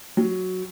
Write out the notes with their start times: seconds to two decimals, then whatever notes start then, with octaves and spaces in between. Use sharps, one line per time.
0.17 F#3